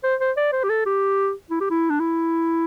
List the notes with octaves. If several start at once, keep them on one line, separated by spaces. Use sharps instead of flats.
C5
C5
D5
C5
G4
A4
G4
E4
G4
E4
D4
E4